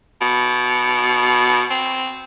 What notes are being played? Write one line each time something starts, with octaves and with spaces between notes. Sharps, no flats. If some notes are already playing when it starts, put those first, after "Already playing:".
B2
C4